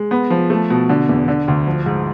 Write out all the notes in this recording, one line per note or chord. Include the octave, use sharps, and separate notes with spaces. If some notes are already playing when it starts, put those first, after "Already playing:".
Already playing: G#3
B3
F3
A3
B2
D3
E2
D3
D2
F3
G#2